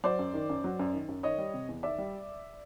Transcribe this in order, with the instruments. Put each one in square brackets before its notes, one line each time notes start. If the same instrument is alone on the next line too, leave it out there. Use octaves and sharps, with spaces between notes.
[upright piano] F#3 C5 D5
F#2
D#3
F#2
F#3
F#2
D#3
F#2
D#3 C#5 D#5
G3
C3
E2
D#3 D5 E5
G3